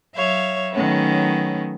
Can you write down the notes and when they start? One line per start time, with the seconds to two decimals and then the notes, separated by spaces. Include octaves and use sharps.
0.16 F#3 C#5 E5 F5
0.72 D#3 F#3 A3 B3 C#4